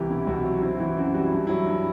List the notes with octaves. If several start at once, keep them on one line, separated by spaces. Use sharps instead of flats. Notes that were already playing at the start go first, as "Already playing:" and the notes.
Already playing: C2 E3 G4
B2 E4
C2 F#4
F#3
C4 E4
F#4
E3 E4
F#2 F#4
G3 F#4
E4
G2
F#3 E4
G2